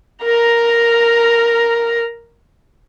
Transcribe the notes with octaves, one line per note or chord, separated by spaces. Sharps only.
A#4 A#5